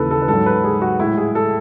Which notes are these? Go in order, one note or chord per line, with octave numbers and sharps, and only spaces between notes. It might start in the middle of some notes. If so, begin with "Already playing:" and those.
Already playing: D#2 C#3 E3 A4 B4
A4
B4
G#2 F#3 A4
B4
G#4
F#4
A2 G#3 E4
G#4
A4